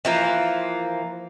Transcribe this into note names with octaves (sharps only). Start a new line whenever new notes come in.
E3 F3 A#3